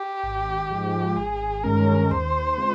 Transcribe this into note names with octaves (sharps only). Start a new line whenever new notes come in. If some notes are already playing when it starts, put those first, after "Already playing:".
Already playing: G4
G#1
G#2 F3 G#3
G#1 G#4
G2 D#3 G#3 C#4 A#4
D#2 C5
C#3 G#3 C4 F4